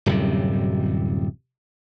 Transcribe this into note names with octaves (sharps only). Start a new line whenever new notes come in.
D1 F#2 C3 G3